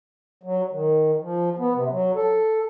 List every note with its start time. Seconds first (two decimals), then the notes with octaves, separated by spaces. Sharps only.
0.43 F#3
0.72 D#3
1.20 F3
1.59 B3
1.74 C3
1.90 F#3
2.15 A4